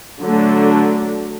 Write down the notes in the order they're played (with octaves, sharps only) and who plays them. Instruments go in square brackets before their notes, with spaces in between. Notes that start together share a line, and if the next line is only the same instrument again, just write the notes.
[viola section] D3 F#3 A3 D4